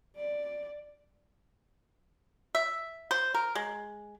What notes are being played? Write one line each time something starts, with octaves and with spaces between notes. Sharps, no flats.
D5
E5
C5
A#4
G#3